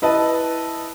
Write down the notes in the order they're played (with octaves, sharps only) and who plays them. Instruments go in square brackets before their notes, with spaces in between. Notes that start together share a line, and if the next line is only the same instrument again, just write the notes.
[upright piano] E4 B4 D#5 A5